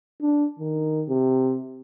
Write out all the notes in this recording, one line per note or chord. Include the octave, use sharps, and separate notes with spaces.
D4
D#3
C3